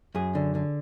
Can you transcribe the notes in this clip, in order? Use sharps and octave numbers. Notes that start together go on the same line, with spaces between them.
F#2 G#4
D3
D3